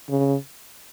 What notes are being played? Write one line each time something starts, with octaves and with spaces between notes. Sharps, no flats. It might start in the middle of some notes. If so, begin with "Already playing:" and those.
C#3